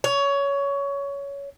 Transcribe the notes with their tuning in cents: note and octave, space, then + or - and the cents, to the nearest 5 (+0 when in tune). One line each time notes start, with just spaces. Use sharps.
C#5 +20